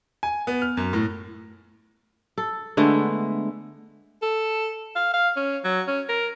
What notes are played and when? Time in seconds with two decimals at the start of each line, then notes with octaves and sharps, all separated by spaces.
0.23 G#5
0.47 B3
0.62 F6
0.77 F#2
0.93 A2
2.38 A4
2.77 D3 G#3 A3 B3
4.22 A4
4.96 F5
5.13 F5
5.37 C#4
5.65 F#3
5.87 C#4
6.09 A#4